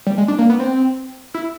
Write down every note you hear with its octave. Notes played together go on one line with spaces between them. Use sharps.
G3
G#3
D4
A#3
B3
C4
E4